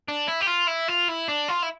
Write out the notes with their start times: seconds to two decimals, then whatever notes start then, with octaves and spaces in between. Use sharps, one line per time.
0.08 D4
0.28 E4
0.42 G4
0.48 F4
0.68 E4
0.88 F4
1.09 E4
1.28 D4
1.48 F4
1.62 E4